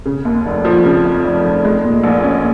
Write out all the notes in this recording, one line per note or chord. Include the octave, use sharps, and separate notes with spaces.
C#3
D#2
F1
F3
C#3
F2
F1
F1
G#3
A#2
A#1
C#4